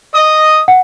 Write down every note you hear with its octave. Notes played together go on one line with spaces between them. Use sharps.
D#5 D#6
F#5